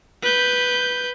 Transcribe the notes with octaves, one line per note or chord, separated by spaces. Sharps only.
B4 G6